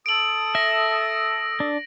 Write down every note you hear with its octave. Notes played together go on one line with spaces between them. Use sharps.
A4 D#6 D7 F#7
E5 A#6
D4